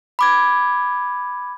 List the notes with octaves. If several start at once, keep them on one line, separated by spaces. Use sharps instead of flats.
B5 D6 G#6